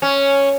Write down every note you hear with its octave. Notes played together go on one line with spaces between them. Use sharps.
C#4